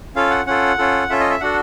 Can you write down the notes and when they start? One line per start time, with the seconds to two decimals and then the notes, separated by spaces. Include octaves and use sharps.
0.16 C#4 F4 A4 F5
0.30 F#5
0.47 C#4 F4 A4 F#5
0.78 C#4 F4 A4
1.10 C#4 F4 A4 E5
1.20 D#5
1.30 E5
1.41 D4 F#4 A4 F#5